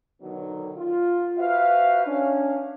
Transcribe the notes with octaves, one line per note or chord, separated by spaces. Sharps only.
B2 D3 D#3 F#3
F4
F#4 B4 C5 E5 F5
C#4 D4